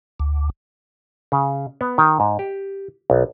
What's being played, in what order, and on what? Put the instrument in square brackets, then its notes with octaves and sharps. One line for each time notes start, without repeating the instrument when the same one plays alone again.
[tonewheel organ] D2
[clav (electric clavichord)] C#3
B3
D#3
G#2
G4
B1